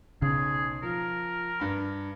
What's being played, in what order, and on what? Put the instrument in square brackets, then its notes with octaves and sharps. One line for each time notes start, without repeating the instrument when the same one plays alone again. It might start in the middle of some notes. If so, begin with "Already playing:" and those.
[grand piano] B1 [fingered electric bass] C#3 [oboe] G#4
[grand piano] F3 [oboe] A#4
[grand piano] G2 B5